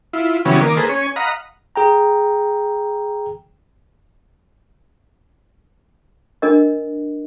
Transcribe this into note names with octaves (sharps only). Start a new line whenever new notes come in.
E4 F4
C#3 E3 F#3 G3 B3 C#4
D#3 A#3 D6
A#3 G#4 A4 B4 C5
C#4 C#5 G#5
D#5 F5 F#5 A#5 B5
G#4 G5 A#5
D4 A#4 D#5